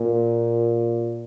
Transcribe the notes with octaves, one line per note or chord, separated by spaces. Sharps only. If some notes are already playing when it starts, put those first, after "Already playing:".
Already playing: A#2